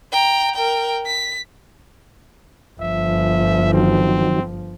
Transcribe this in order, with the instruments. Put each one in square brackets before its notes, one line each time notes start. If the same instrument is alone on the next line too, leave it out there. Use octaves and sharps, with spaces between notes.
[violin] G5 A#5
A#4 G5
B6
[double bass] G1 F3 [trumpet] E5
[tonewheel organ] D#3 F#3 [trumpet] C4